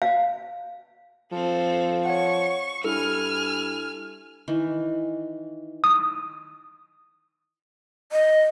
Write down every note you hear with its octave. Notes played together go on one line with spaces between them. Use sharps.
F5
F3 C4 A4
C#5 F#5 C#6
G2 E4 A4 G#5 F6
D#3 E3
D#6
D#5